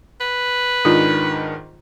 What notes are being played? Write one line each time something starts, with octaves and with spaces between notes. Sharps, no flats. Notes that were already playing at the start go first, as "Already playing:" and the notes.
B4
G#2 D#3 D4 F4